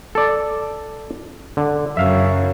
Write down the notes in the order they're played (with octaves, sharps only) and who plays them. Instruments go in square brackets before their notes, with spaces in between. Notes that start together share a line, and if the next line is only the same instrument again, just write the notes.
[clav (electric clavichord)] A4 D5
D3
[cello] F#2 C#3 [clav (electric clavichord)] E5 F5